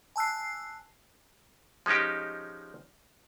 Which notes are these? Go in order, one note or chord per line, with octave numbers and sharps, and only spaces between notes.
G#5 A5 E6 F#6 C7
F3 G#3 C#4 D#4 G4